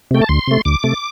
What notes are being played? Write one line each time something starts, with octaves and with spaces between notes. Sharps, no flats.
C3 A3 G5
A5
D2 C6
C3 A3
D2 D6
C3 A3